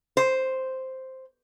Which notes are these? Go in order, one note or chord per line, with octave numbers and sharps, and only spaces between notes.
C5